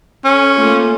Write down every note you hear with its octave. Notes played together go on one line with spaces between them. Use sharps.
C#4 A4
A3 A#3 F4